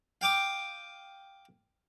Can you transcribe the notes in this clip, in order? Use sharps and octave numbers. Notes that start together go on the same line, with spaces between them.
F5 G5 D6 D#6